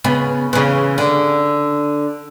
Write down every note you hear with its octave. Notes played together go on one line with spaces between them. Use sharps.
C#3 B3
C#3 E3
D3